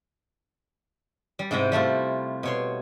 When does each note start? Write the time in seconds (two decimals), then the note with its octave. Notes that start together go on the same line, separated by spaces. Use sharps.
1.39 G3
1.51 G#2 C3 E4 D#5 G5
1.72 G3 A3 E4 F4
2.43 B2 C#5 C6